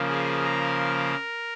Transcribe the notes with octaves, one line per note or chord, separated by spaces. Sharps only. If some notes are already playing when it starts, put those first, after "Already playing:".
Already playing: C#3 F3 A#3
G#4
A#4